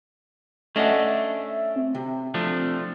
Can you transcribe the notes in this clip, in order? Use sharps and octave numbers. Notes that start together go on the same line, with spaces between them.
A3 C#4 D4 D#5 E5 F#5
C4
C3
F3 A3 D4